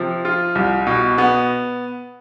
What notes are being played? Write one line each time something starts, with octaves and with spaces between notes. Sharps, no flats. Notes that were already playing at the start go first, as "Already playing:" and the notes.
Already playing: C3 F3
F4
C2
B2
B3